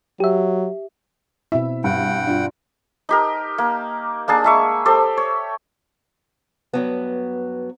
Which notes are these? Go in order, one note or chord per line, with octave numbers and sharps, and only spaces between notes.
F#3 G4 E5
B2 C4 E4 E5
G2 F#5 G5
D4 F4
D#4 G4 A#4
A#3
A#3 D4 G#4 A5
G#3 E5 C#6
G4 A4 C5 D5
C#5
G2 F#3 B3